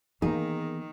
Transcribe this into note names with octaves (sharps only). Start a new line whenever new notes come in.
D#3 E3 A#3 B3 D#4 G#4